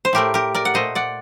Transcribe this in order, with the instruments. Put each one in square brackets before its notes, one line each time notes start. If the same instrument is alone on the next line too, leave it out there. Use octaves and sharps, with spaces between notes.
[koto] C5
A2 A3 G4 A#4
G4 A#4
A#4 D5
F#5
A#2 A3 C5 D#5
D5 F#5